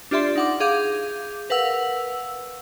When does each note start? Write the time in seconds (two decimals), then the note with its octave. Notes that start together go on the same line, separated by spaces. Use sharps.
0.11 D4 F4 G4 D5 E5 C6
0.36 D#4 F#5 D6
0.60 G#4 F5 D6 G6
1.50 A#4 B4 F5 F#5 E6